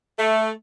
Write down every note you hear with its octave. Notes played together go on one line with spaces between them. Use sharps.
A3